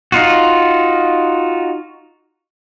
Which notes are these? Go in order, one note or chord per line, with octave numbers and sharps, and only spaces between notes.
D#4 F4 F#4